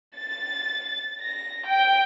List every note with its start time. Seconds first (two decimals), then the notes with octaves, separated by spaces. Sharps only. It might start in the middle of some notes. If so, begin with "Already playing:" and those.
0.20 A6
1.20 A#6
1.67 G5